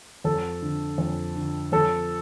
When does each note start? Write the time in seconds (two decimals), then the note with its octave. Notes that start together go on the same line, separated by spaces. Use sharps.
0.24 F2 A4
0.62 D3
0.98 F2
1.35 D3
1.72 F2 A4